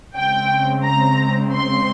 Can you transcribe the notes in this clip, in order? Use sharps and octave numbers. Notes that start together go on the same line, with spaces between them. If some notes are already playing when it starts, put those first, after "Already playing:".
C#3 G#3 C4 G5
A#5
C6